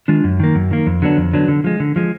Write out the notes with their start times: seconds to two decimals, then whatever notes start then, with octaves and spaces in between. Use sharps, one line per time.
0.08 D#3 G#3 D4 F4
0.24 F#2
0.40 D#3 A#3
0.55 F#2
0.71 D#3 A#3
0.87 F2
1.02 D3 F#3 B3 D4
1.18 F2
1.33 D3 F#3 B3 D4
1.48 D3
1.64 F3 G#3
1.80 D3
1.96 F3 G#3